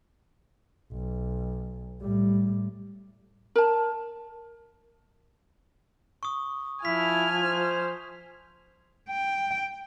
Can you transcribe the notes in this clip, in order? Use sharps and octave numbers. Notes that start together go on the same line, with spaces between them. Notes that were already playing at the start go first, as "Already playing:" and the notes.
B1
A2 G3
A#4 A5
C#6 D#6
F3 E4 G#5 F6 B6
C5
G5